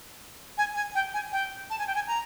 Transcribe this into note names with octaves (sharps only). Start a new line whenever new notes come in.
G#5
G#5
G5
G#5
G5
A5
G#5
G5
G#5
A#5